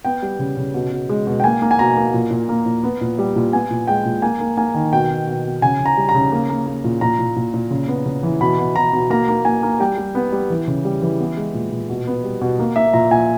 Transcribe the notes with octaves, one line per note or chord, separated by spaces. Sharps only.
B3 G5
G3
C#3
C#3
B2
B2
G#3
B2
G5
A#3 G#5
A#3
G#5
B2 A#5
A#3
A#2
A#2
A#3
A#2
B3
A#2
G3
A#2
B3 G#5
A#2
G#3 G5
A#2
A#3 G#5
A#3
A#3 G#5
D#3
B2 G5
B2
B2
B2
C#3 G#5
C#3
A#5
G3
A#5
C#3
A#3
A#3
A#3
A#2
A#2 A#5
A#2
A#2
A#2
C#3
B3
C#3
E3
B2 B5
B2
B2 A#5
B2
A#3 A#5
A#3
A#3 G#5
A#3
G3 G5
G3
B3
G3
E3
C#3
G3
E3
B3
G#3
A#2
A#2
B2
B3
G3
B2
A#3
A#3 E5
A#2 A#5
A#2 G#5